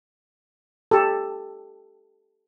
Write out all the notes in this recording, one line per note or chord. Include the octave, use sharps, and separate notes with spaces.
G4 A4